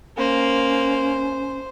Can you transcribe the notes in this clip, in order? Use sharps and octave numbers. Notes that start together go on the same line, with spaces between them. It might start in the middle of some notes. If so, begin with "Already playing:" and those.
A#3 C#4 C5